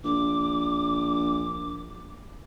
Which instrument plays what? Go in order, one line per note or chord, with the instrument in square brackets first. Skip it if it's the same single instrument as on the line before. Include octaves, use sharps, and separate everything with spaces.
[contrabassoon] A#1 [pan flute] D6